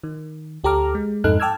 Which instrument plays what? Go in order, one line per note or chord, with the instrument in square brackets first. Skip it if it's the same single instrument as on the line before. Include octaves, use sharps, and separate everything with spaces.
[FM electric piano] D#3
D2 G4 A4 A#5 D6 F6
G#3
F2 G#2 D#4 A4 F6 F#6
G5 A5 D6 E6 F6 G#6